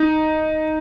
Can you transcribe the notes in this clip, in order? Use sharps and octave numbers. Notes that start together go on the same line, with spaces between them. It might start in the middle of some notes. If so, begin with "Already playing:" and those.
Already playing: D#4